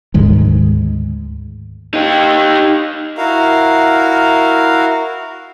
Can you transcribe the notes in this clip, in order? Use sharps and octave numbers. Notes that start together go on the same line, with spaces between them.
D2 G#2 D#3 G#3
D#4 G4
E4 F#4 A#4 F5